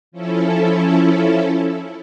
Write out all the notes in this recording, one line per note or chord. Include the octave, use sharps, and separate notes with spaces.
F3 C#4 E4 A4